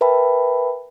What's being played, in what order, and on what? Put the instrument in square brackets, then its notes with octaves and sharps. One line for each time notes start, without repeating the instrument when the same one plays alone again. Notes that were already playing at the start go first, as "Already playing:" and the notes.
[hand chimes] A#4 B4 E5 G5 A5 B5